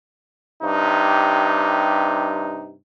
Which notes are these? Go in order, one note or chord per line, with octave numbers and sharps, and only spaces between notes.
G2 C3 D#4